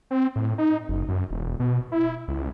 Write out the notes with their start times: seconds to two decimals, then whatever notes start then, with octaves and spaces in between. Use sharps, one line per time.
0.11 C4
0.36 A2
0.58 D#4
0.89 F#1
1.08 F#2
1.30 E1
1.60 B2
1.92 E4
2.28 C#2